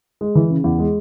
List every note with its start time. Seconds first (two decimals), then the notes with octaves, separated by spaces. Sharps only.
0.21 G#3
0.35 E3
0.50 C#3
0.64 E2
0.79 G#3